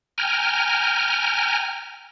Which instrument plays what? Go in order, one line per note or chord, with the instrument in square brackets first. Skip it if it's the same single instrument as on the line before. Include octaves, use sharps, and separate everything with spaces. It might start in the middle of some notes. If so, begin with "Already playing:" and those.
[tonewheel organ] G5 G#5 A#5 F6